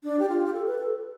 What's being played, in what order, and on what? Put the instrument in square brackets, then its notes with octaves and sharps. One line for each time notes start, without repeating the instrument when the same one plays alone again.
[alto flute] D4
G4
F4
G4
A4
B4
A4